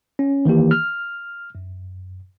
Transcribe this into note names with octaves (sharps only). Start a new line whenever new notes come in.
C#4
D#3 E3 A#3 G4
F6
F#2